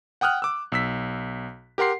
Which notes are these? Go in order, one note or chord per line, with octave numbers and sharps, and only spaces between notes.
F#5 G5 D#6 F6 F#6
D6 E6
B1 E6 B6
G4 A#4 F#5 C6 C7